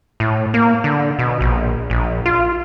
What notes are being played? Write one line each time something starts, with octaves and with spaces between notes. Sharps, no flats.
A2
A#3
D3
B2
A#1
A#1
F4